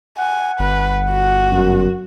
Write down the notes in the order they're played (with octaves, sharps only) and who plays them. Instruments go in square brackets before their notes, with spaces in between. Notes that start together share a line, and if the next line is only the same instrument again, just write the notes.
[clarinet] F#5 [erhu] G#5
[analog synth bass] G1 [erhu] B4
[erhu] F#4
[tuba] F#2